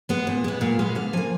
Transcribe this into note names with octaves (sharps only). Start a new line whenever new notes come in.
G#3 B3
A#2
G#3 B3
A#2 F5
G#3 B3 F5
D3 F5
F3 A#3 G#5